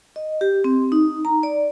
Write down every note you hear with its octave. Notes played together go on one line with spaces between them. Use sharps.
D#5
G4
C4
D#4
A#5
D5